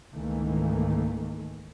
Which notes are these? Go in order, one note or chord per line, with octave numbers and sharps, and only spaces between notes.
C#2 G#2 D#3 E3 A3 A#3